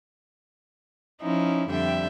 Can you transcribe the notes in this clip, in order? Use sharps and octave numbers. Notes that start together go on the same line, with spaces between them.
F3 C#4 D#4 E4
F2 D3 G3 E5 G5